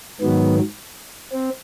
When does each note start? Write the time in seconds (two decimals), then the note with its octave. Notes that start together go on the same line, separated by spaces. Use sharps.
0.21 G#2 D#3 F#3 B3
1.33 C4